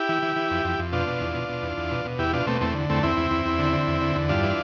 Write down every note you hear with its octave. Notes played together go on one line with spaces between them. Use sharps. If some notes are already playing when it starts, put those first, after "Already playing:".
Already playing: E4 G4
E3
E3
E3
F2
F2
F2
B2 D4 F4
B2
E2
B2
B2
E2
E2
B2
B2
E2 E4 G4
B2 D4 F4
B2 A3 C4
E2 A3 C4
D3
E2 A3 C4
E2 C4 E4
E2
E2
E2
D3
D3
E2
D3
E2
G2 D4 F4
E3